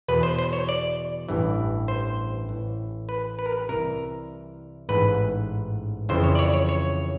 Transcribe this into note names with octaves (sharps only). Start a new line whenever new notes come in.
E2 B2 B4
C5
C5
C#5
D5
A1 G2 E3
C5
A1 A2 E3
B4
B4
A#4
B4
C2 C3 E3 A#4
A1 G#2 E3 B4
F2 C#3 E3 C5
C#5
D5
C#5
C#5
C#5